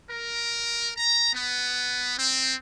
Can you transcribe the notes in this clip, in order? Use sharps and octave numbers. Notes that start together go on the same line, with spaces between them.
A#4
A#5
B3
C4